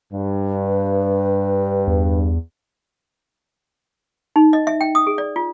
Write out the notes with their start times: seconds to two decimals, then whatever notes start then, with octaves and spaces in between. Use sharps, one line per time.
0.13 G2
0.65 B4
1.87 E2
4.36 D#4
4.53 D#5
4.67 E5
4.81 G5
4.95 D#6
5.07 G#4
5.18 D5
5.36 F4